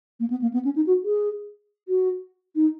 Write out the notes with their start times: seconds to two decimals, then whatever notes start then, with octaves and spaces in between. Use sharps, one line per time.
0.20 A#3
0.30 B3
0.42 A#3
0.53 B3
0.65 C#4
0.76 D#4
0.87 F#4
1.04 G#4
1.88 F#4
2.55 D#4